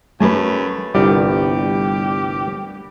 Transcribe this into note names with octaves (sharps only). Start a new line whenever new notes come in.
F#2 A3 B4 G#5
G1 C2 G3 B3 G4